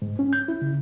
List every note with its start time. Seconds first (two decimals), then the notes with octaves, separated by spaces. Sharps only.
0.02 G#2
0.19 C#4
0.33 G6
0.48 E4
0.62 C#3